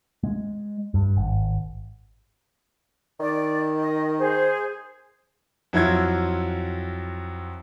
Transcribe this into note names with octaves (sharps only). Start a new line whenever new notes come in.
G#3
G2
G#1
D#3 D5
D#5
G#4 C5
F2 F#3 E4 F4 G#6